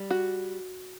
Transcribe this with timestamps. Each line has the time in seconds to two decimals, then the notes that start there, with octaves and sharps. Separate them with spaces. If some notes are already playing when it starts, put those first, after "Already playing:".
Already playing: G3
0.10 F#4